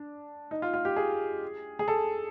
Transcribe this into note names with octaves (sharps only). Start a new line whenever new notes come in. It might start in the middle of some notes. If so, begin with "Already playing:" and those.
Already playing: D4
D#4
F4
F4
G4
G#4
G#4
A4